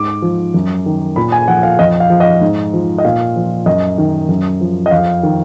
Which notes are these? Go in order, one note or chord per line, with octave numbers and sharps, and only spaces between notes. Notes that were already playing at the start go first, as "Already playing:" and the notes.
Already playing: G#2 D6
F3
F#2
D#3
A#2 B5
G#5
F3 F#5
F5
F2 D#5
F5
F3
D#5
G#2
F3
D#5
A#2 F5
F3
F#2 D#5
D#3
F#2
F3
D#5
F2 F5
D#3